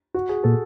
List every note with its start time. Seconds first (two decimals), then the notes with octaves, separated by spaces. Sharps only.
0.14 F#4
0.29 G#4
0.44 A#2 A4